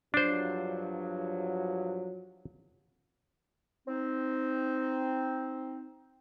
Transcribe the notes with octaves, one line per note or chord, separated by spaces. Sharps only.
G2 F3 F#3 D4 C5
C4 D#4